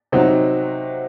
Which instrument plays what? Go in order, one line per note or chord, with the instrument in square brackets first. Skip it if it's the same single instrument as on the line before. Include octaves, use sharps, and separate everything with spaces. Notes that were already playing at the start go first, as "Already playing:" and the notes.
[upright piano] C3 F#3 C4 D#4 F#4